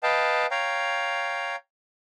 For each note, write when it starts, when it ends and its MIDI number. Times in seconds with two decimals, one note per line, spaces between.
0.03 0.46 71
0.03 0.46 75
0.03 0.46 77
0.03 0.46 79
0.03 0.46 81
0.51 1.56 73
0.51 1.56 77
0.51 1.56 79
0.51 1.56 82